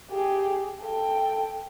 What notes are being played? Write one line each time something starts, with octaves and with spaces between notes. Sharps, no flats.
G4 G#4
A4 G5